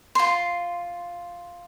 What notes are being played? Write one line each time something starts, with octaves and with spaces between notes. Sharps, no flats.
F4 C6